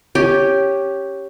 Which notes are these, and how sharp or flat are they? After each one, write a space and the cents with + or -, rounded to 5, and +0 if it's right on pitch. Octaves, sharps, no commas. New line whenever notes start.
C#4 +0 G4 +0